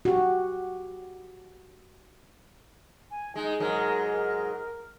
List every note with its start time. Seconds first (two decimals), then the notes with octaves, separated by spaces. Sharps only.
0.05 F#4 G4
3.11 G#5
3.36 G#3 D#4
3.60 G#2 F#3 G#3 A#4
4.12 A#4